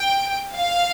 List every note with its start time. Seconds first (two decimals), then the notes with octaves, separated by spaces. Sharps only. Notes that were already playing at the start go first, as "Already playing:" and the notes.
Already playing: G5
0.56 F5